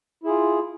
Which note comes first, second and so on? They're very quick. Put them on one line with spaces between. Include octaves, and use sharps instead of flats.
E4 G#4 F4